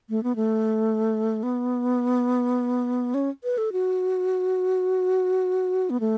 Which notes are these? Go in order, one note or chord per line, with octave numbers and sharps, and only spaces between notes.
A3
B3
A3
B3
C#4
B4
A4
F#4
B3
A3